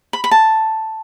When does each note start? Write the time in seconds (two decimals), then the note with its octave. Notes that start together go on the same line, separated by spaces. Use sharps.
0.13 B5
0.24 B5
0.31 A5